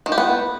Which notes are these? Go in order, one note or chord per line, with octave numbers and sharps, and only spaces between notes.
D#3
G4
B3